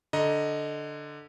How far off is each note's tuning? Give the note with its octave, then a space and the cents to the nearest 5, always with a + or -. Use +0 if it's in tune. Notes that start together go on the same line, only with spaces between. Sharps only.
D3 +0 D#5 +0 A#5 +15